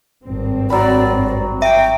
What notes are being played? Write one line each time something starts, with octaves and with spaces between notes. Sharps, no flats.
G#1 G2 C4
F#3 D5 B5
E5 G5